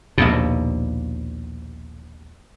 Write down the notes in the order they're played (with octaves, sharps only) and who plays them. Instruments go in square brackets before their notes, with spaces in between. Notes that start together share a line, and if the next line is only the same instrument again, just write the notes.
[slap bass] A#1 D#2 B2